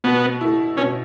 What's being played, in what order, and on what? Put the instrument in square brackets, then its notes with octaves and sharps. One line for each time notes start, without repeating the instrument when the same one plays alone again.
[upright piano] B2 [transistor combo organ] B3
[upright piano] A3 E4
[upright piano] B2 [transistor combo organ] C#4